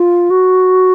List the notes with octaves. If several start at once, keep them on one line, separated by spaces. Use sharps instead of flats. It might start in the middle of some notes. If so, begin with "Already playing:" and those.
Already playing: F4
F#4